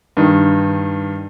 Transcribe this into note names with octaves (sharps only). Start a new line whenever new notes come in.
G2 D#3